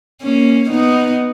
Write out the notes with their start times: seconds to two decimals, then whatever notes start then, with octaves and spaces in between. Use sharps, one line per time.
0.23 A#3 C#4
0.70 B3 D#4